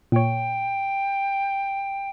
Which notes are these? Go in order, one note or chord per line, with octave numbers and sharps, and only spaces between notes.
A#2 C#5 G5